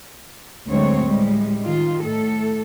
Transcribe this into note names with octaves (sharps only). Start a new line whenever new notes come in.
D2 D3 F#3 G#3 C4 C#5
A2 G3 G#3
D#3 F4
A2 A4